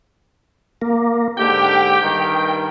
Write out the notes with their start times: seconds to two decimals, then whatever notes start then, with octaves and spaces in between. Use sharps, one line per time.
0.82 A#3
1.37 G#2 D3 G4 G5
2.00 G2 D#3